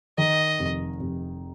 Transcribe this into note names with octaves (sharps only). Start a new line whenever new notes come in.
D#3 D#5
F1
F1